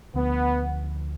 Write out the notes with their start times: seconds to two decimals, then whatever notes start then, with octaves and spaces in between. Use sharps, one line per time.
0.14 D2 D3 F3 A3 B3